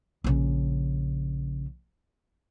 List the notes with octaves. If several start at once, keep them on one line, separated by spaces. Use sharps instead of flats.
A#1 C#3